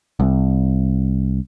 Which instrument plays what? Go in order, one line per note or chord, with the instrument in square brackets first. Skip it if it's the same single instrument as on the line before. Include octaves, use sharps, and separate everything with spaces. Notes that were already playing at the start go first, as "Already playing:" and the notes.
[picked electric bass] C2